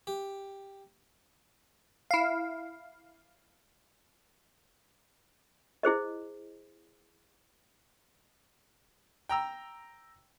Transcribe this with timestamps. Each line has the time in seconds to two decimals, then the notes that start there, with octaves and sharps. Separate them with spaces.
0.07 G4
2.11 E4 F5
5.83 E4 G#4 C5 D#5
9.29 G5 A#5 E6